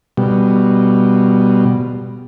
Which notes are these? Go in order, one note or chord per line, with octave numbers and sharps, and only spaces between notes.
B2 G3